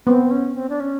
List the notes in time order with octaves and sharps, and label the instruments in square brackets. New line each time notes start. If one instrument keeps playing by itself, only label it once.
[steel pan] B3 [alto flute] C4
[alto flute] C#4
C4
D4
C#4